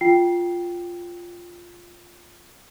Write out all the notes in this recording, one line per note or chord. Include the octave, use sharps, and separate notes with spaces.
F4 G5 C7